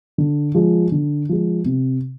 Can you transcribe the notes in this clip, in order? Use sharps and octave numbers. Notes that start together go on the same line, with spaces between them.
D3
F3 G#3
D3
F3 G#3
C3